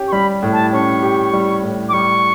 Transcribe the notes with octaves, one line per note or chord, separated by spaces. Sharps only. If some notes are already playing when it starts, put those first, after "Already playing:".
Already playing: C#4 G4
C#6
G3 B5
A2
A5
C#4 C#6
G4
G3
A2
D6
G3 C#6